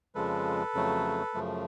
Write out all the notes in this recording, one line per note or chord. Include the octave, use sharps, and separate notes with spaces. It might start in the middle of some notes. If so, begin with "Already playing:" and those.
F2 C#3 F3 G#3 A4 B4
F2 C#3 F#3 A3
F#2 C#3 F3 A3